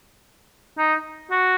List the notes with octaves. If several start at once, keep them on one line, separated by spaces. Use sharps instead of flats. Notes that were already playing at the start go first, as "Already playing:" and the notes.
D#4
F#4